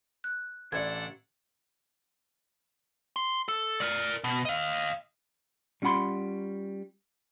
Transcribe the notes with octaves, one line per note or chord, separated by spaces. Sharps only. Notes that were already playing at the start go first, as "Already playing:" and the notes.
F#6
A1 D4 E4 A4 D5 F#5 G#6
C6
A4
A#4 D5
B2
D#5 F5
G3 C#4 F4 F#5 B5 C6